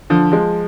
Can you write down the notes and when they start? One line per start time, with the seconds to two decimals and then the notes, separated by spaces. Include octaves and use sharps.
0.10 D3 F3
0.32 F3 G#3